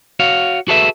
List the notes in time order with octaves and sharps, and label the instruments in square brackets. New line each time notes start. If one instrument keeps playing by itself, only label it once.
[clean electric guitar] F#4 C#5 F5
F#4 G#4 A4 B4 E5